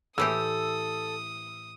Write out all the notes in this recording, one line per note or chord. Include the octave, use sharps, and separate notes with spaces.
A2 E3 G4 A4 D#6 E6